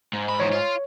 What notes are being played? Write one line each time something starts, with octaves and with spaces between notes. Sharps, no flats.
G#2
B5
E2 A#2 C#5
F4